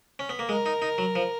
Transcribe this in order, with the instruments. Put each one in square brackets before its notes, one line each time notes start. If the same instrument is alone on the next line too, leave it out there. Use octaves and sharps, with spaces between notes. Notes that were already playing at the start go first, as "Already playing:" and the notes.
[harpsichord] C#4
B3
A#3
[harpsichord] G#3 [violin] A#4
[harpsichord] D#4
D#4
F#3
F3